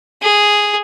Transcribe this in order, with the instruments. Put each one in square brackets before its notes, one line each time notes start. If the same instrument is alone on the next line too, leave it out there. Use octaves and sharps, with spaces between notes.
[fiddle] G#4